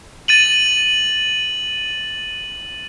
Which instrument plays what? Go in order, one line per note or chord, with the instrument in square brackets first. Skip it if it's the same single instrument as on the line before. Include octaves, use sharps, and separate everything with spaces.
[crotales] A6 D#7 F#7